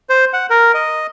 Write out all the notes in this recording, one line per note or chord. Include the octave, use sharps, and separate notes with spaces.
C5
F#5
A#4
D#5